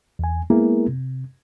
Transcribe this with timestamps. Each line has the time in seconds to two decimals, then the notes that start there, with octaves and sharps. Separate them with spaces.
0.19 E2 G#5
0.50 G#3 A#3 B3 E4 G#4 A#4
0.88 C3